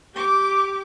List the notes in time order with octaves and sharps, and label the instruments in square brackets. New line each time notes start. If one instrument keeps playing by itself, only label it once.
[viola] G4 D6